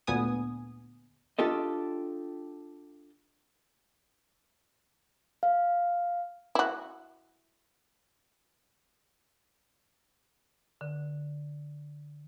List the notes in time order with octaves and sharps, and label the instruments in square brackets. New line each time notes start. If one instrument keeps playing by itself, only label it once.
[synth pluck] D2 A#2 B3 G#5 D#6
[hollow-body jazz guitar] D4 F4 G4 A4 D#5
[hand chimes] F5
[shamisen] E4 F#4
[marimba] D3